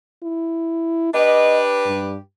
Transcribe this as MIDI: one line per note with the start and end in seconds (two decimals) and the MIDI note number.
0.23 1.11 64
1.14 2.16 62
1.14 2.16 67
1.14 2.16 71
1.14 1.59 75
1.86 2.16 43